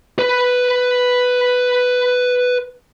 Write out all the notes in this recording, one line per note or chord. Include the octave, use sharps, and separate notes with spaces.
B4 B5